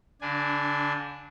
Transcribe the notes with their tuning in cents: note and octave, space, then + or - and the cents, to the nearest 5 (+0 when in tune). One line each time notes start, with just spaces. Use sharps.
D3 -40 D4 +0 G#5 +0